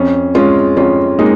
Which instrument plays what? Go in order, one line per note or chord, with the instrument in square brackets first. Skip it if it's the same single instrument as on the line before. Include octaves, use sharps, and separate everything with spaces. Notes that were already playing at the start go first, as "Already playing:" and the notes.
Already playing: [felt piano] F2 C#4
G#3 C#4 F4
F2 C#4 F4
G#3 A#3 D#4